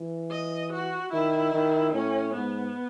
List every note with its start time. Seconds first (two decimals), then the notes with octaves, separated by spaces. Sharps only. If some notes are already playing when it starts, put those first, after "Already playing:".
Already playing: E3
0.31 D#5
0.72 F#4
1.12 D#3 E4
1.53 D#3
1.93 A2 C#4
2.34 G#2 B3